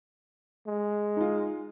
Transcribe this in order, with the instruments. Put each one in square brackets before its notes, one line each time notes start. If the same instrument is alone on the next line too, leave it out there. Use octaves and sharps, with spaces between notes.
[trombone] G#3
[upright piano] D#4 F4